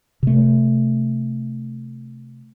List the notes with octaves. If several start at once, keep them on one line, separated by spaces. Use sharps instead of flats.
C3 A3